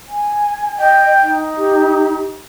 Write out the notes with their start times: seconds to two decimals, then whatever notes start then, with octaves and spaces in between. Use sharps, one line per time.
0.08 G#5
0.78 D#5 G5
1.22 D#4
1.58 G4